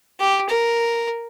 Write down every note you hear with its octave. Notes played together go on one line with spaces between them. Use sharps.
G4
A#4